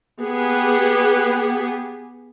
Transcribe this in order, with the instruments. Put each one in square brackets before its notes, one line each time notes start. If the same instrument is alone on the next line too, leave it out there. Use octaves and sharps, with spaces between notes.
[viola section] B3 G4 G#4